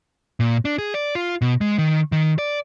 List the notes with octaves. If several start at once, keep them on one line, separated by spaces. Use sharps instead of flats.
A#2
D4
G#4
D5
F4
B2
G#3
D#3
D#3
D5